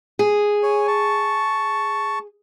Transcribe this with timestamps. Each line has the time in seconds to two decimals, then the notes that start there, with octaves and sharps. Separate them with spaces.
0.19 G#4
0.63 C#5 G#5
0.87 A5 C#6